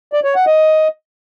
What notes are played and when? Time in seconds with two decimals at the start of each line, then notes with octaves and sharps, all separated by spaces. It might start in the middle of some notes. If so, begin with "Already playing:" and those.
0.13 D5
0.24 C#5
0.35 F#5
0.46 D#5